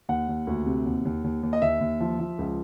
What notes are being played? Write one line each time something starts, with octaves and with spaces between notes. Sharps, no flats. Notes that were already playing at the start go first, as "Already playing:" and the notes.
D#2 F#5
D#2
D2
C3
D#2
D#2
D#2
D#2
D#5
D#2 E5
D#2
F3
F3
C#2